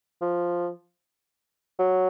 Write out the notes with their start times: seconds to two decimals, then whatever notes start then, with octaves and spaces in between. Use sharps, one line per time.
0.21 F3
1.79 F#3